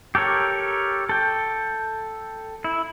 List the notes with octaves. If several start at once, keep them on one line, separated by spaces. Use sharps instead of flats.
G4 A4 A#4 C#5
A4 G5
E4